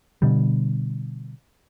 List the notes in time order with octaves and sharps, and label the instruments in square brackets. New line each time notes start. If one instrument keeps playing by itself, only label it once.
[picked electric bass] B2 D3 G3